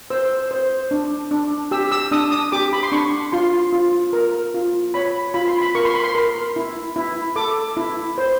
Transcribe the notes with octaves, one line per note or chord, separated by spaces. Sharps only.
C5 E6
C5
D4
D4
G4 E6
E6
D4 D#6
D#6
G4 D6
B5
C6
D4 C#6
F4 C6
F4
A#4
F4
C#5 B5
F4 B5
C6
B5
A#4 C#6
C6
B5
C6
A#4
E4
E4
A4 D6
E4
C5